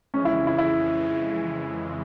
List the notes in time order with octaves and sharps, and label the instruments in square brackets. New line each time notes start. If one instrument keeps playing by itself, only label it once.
[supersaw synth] F2 C#3 E3 G#3 [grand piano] C#4
[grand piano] E4
E4
E4